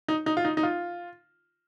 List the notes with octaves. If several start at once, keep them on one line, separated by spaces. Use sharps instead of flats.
D#4
D#4
F4
D#4
D#4
F4